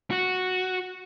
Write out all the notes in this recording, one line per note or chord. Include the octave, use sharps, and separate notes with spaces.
F#4